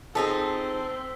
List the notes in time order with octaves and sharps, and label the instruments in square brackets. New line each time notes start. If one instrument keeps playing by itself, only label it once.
[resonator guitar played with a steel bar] F3 D#4 G#4 [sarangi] C4 [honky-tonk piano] A4 [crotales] E6 B6